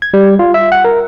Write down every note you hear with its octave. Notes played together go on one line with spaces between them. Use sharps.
G#6
G3
F4
E5
F#5
A#4